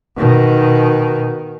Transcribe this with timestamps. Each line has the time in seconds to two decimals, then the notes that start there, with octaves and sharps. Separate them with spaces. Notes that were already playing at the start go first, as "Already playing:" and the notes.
0.17 B2 D#3